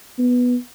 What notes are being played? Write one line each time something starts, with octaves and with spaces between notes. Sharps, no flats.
B3